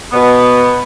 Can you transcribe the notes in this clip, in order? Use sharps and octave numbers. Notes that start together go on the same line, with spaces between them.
B2 B3